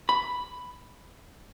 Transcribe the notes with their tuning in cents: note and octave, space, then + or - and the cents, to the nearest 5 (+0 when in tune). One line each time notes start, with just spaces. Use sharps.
B5 +5